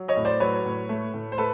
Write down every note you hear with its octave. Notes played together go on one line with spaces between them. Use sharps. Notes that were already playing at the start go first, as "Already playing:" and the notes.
Already playing: F#3
C#5 D#5
A2
C5 D5
F#3 B4 C#5
A2
A3
A2
C5
A3 A4 B4